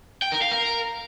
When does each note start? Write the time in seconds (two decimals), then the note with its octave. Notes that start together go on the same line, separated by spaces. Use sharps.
0.22 G5
0.32 A#4
0.42 F5
0.52 A#4